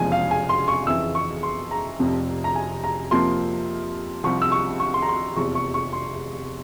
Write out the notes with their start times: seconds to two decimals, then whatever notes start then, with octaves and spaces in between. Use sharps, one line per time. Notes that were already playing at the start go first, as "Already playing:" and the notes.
Already playing: F1 E2 C#3 F3 G#3 G#5
0.12 F5
0.31 G#5
0.49 C6
0.68 C#6
0.87 F2 C#3 E3 E6
1.15 C#6
1.43 C6
1.71 A#5
1.99 F1 F2 C3 F3
2.44 A#5
2.56 G#5
2.84 A#5
3.11 F2 C3 F3 A#3 C6
4.23 C2 C3 F3 C4 C#6
4.42 E6
4.52 C#6
4.80 C#6
4.94 C6
5.02 A#5
5.09 C6
5.36 F1 E2 C3 F3 C#6
5.55 C#6
5.74 C#6
5.93 C6